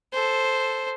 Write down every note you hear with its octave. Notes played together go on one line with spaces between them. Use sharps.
A4 C5